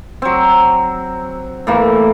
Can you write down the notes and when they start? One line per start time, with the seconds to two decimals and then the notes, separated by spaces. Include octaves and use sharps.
0.22 F#3 C4
1.67 A2 E3 A#3